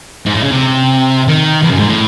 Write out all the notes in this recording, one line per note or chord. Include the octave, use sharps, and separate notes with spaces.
G#2
A2
C#3
C3
D#3
E2
F#2
G#2
A2